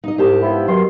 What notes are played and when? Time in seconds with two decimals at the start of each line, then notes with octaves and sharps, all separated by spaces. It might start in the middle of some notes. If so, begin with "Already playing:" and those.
0.04 D#4 D#5
0.18 C2 G#2 G4 A5
0.42 F3 B3 E4
0.68 B2 D#3 F#3 C6